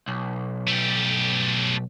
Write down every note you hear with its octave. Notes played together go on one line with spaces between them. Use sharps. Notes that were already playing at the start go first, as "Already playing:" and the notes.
B1
A3 G4